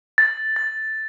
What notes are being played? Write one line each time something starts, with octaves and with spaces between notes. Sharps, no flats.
A6
A6